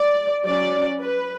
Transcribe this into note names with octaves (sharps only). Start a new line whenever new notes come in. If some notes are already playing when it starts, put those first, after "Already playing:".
Already playing: D5
F#3 C#4 D5
B4